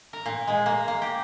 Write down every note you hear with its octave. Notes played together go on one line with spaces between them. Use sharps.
A#4
A#2
G#3
A#3
A#3
G4